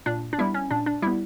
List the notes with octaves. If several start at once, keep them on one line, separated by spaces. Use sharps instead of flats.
A#2 D4
D4
G3 B3 E4
C#4
A#2 D4
D4
G3 B3 E4